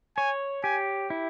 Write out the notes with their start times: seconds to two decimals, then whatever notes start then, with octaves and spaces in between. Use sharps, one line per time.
0.17 C#5 G#5
0.64 G4 G#5
1.10 E4